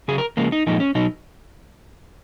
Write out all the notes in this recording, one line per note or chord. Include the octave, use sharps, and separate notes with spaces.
C#3 F#3 G#4
A#4
C#3 F3 G#3 A#3
D#4
A#2 F3 G#3 D#4
C#4
B2 F#3 D#4